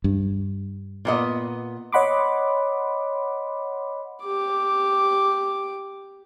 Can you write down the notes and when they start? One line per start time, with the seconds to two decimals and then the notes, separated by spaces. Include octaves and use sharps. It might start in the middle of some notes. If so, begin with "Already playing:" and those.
0.04 G2
1.05 A#2 B3 D#5
1.92 C#5 D#5 F#5 B5 C6 D6
4.24 G4 D6